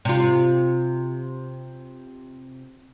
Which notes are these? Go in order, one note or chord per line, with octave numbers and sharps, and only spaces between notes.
C3 F4